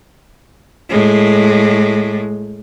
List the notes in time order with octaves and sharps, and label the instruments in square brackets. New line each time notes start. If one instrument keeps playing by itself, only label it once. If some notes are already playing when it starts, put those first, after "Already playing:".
[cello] A2 G#3